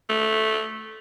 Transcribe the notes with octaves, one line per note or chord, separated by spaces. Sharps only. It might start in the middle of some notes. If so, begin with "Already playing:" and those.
A3